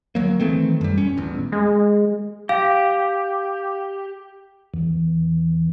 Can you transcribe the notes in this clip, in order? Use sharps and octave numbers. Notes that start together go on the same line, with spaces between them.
D2 F#3 A#3
D#3 E3 A3 C4
F#2 G3
D#1 C#4
D#1 A1 E2
G#3
G4 F5
E2